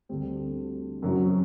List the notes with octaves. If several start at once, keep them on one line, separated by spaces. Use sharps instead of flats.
D2 D3 G3 C4
F#1 F#2 F#3 C4 F#4